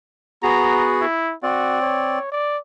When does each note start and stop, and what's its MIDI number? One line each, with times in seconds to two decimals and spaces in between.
0.43 1.05 59
0.43 1.05 66
0.43 1.05 68
0.43 0.87 82
1.01 1.34 64
1.43 2.19 60
1.43 1.81 66
1.43 2.19 74
1.81 2.31 73
2.32 2.58 74